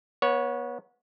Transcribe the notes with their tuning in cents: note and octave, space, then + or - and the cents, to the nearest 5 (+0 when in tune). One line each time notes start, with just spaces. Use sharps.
B3 -30 C#5 +0